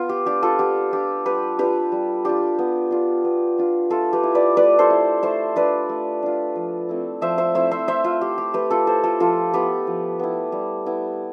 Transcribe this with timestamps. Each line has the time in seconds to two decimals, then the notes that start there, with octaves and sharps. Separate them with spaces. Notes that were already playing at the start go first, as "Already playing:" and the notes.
Already playing: B3 F4
0.09 G4
0.26 D4 F4 G4
0.42 F4 A4
0.59 B3 G4
0.92 D4 F4 G4
1.26 G3 G4 B4
1.58 D4 F4 G4 B4
1.92 G3
2.25 D4 F4 G4
2.59 B3
2.91 D4 F4
3.24 B3
3.58 D4 F4
3.90 A3 F4 A4
4.13 G4 B4
4.23 E4
4.35 B4 D5
4.56 A3 B4 D5
4.79 A4 C5
4.90 E4
5.22 A3 C5 E5
5.56 D4 F4 B4 D5
5.89 A3
6.22 D4 F4
6.56 F3
6.89 A3 C4 E4
7.21 F3 C5 E5
7.38 C5 E5
7.55 A3 C4 E4 C5 E5
7.71 C5 E5
7.88 A3 C5 E5
8.04 F4
8.21 E4 G4
8.38 G4
8.54 A3 G4 B4
8.70 F4 A4
8.87 E4 A4 C5
9.04 F4 A4
9.20 F3 F4 A4
9.54 B3 E4 G4 B4
9.87 F3
10.19 B3 E4
10.52 G3
10.86 B3 E4